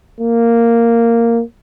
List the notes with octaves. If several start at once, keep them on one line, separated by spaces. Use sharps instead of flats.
A#3